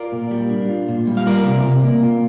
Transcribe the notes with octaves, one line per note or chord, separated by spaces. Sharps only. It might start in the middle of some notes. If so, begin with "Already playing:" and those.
Already playing: F4 A#4 D5
A#2
G3
D4
F4
A#2
G3
F5
F4 A#4 D5
C3
C3
A#3
F4